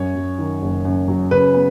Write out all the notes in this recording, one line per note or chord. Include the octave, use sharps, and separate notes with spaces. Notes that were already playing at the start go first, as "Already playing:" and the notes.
Already playing: F#2 C#5
F#3
D#3
F#1
F#2
F#3
C#3 B4
B3